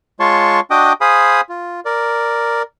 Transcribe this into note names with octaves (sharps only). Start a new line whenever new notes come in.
G#3 F4 C#5 A5 C6 C#6
D4 F#4 D#5 G5 D6 D#6
G#4 C5 F5 G#5 B5 D#6
F4
A#4 D5